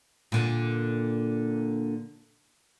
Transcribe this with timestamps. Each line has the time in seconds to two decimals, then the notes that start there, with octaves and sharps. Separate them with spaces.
0.32 A#2 D3